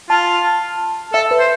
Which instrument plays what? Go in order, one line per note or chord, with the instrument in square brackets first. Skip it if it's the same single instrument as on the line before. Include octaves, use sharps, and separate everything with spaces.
[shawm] F4 [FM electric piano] A5
[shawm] A4 [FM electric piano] E5
[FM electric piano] B4
[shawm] C5